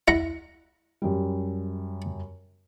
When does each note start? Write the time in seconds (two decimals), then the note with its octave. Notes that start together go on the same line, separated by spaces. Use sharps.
0.08 E4 F#5 A#5
1.02 F#2 G3